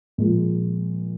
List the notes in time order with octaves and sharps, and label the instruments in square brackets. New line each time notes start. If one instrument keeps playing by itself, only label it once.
[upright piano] A#2 F3 G#3